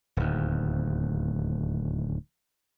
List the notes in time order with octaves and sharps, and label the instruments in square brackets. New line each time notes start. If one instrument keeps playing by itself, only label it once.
[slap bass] D1 D#2